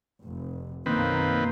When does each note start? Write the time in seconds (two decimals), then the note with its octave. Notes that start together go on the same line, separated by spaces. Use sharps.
0.22 F1
0.86 B1 F#2 D#3 A#3 C4 B4